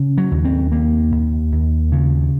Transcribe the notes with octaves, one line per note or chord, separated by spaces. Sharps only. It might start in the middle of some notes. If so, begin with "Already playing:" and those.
Already playing: C#3
F#3
D#2
C4
D#2 A#3
D#2
D#2
C#3